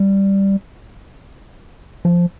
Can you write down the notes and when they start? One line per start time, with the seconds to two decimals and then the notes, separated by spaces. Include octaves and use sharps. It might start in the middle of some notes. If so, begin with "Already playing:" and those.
Already playing: G3
2.05 F3